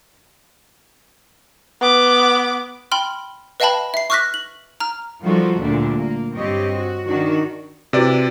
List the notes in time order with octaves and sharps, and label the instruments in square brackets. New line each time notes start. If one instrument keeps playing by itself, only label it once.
[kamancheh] B3 D6
[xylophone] G5 B5 C6 F6
B4 D#5 F5 G5 A5 B5
E5 C7
C#6 D6 F6 F#6 A#6 B6
F#7
A#5 F6
[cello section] D#3 F3 G3 F4 F#4 A4
D2 A#2 D3 G3 A3 D4
A#3
G2 C4 G4 C#5 D#5
F#4
D#3 D4 F#4
[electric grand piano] C3 D5 [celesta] E4 F#4 B4